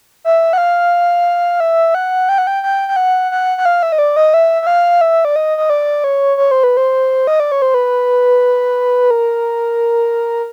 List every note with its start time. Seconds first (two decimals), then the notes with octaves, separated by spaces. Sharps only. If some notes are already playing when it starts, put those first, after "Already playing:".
0.24 E5
0.53 F#5
0.58 F5
1.60 E5
1.95 F#5
2.29 G5
2.38 F#5
2.47 G5
2.63 G5
2.88 G5
2.96 F#5
3.31 F#5
3.58 F#5
3.65 F5
3.83 E5
3.92 D#5
3.99 D5
4.16 D#5
4.34 E5
4.62 E5
4.67 F5
5.01 E5
5.25 D5
5.36 D#5
5.58 D#5
5.70 D5
6.04 C#5
6.37 C#5
6.51 C5
6.64 B4
6.77 C5
7.27 D#5
7.40 D5
7.52 C#5
7.62 C5
7.74 B4
9.11 A#4